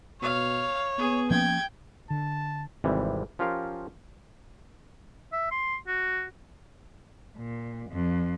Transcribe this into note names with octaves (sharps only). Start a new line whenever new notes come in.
B2 C#5 F5
B3 G#4
F3 A#3 C#4 G5 G#6
D3 A5
G#1 C3 E3 G3
F3 C#4 F4 G4 A#4 F5
E5
C6
F#4
A#2
F2